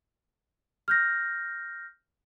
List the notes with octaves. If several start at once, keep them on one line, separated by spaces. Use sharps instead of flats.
F6 G6 A#6